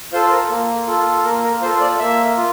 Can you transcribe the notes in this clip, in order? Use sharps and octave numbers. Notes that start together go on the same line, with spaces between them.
F4 A4 C5
A#4
A#3
F4 A4
A#3 A#4
A#4
F4 A4 C5
D5
A#3 E5
F4